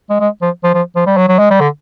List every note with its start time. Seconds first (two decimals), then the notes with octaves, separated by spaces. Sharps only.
0.09 G#3
0.20 G#3
0.42 F3
0.63 F3
0.74 F3
0.96 F3
1.06 G3
1.17 F#3
1.28 F#3
1.39 G#3
1.50 G3
1.60 D3